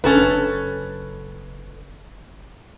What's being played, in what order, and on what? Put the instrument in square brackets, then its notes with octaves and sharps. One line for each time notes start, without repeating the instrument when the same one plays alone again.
[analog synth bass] F#1 [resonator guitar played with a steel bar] C#4 A4 B4